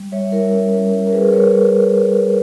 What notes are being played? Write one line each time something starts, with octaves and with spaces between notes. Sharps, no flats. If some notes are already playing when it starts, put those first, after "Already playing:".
Already playing: G3
G3 C#5 E5
E4 A#4 C#5
C#4
G3
G3
A#4
G3 G#4 B4
G3 A#4 C#5